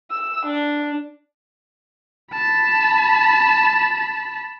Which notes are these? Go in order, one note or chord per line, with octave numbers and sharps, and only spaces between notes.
E6
D4
A5 B5